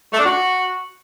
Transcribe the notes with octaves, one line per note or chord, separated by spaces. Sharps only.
A3
D4
F#4